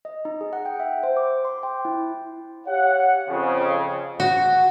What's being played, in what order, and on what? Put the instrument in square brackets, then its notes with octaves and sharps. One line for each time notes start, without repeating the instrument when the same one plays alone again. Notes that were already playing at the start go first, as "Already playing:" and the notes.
[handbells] D#5
D#4
G#4
F#5
G5
E5
C5
D6
C6
G5
E4
[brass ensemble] G4 C#5 F5 F#5
F2 C#3
[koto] F#4